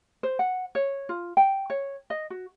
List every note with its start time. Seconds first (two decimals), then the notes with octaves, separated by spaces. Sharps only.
0.23 C5
0.39 F#5
0.75 C#5
1.09 F4
1.37 G5
1.70 C#5
2.10 D#5
2.30 F#4